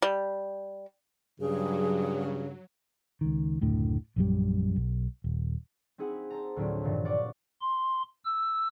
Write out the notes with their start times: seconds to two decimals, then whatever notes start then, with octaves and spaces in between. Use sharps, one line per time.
0.02 G3
1.40 G2 C#3 F#3 G#4
3.21 C#2 D#3
3.61 F#1 D2 A2 D3
4.16 A#1 F#2 G3
4.76 B1
5.24 D#1
5.98 C4 D#4 E4 G#4 F#5
6.30 C5 A5 A#5
6.56 D2 A2 F#3 C4 F4 D7
6.84 G2 A#2 D#3 E3
7.05 D5 F5 F#5 C#6 D6
7.61 C6
8.24 E6